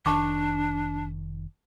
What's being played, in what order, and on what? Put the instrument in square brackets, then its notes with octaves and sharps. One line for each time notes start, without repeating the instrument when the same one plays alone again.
[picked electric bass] F1 D#3 [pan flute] D4 [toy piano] A5 C#6 D6